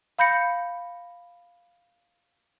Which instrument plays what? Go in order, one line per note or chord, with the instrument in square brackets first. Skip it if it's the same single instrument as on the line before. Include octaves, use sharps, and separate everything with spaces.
[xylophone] F5 B5 G6 A#6 C#7